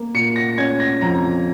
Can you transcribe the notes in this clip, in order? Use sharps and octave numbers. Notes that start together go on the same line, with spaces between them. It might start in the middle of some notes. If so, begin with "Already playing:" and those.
Already playing: A#3
A#2 C#7
A#6
C#4 G#6
A#6
F2 A#5